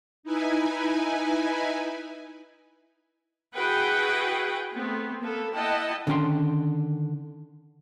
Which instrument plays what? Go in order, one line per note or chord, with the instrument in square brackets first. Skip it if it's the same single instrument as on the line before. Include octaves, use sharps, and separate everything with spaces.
[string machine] D#4 E4 B4 G#5
[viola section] E4 F#4 G#4 B4 F#5 G5
A3 B3 C4
A#3 B3 A4
E4 D#5 F#5 G5 A5
[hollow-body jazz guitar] D3 D#3 C#4 F5 G5 C6